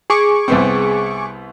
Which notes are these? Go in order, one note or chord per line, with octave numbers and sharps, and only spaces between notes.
G#4 C#6 D6
C2 B3 C4